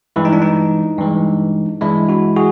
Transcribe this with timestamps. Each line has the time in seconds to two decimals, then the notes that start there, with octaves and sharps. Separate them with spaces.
0.16 G2 E3 G#3 E4
0.25 D#4
0.33 D4
0.42 D#4
0.98 G2 E3 G#3
1.81 G2 E3 G#3 D4 E4
2.09 E4 F#4
2.36 F#4 G#4